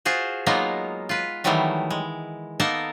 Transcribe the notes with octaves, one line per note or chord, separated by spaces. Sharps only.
F4 F#4 G#4 C5
F#3 G#3 A#3 B3 D#4 F4
F4 B4
D#3 E3 F#3 G3 A3 B3
G#3
A#3 B3 D#4 A4 A#4 A5